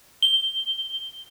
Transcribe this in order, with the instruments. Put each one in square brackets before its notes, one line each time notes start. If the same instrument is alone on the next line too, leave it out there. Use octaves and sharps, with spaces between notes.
[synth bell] G7